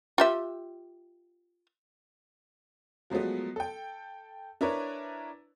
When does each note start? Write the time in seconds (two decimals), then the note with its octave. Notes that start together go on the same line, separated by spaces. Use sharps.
0.18 F4 G4 E5
3.10 F3 F#3 G#3 A3 B3
3.56 A4 G5
4.61 D4 E4 A#4 B4 C#5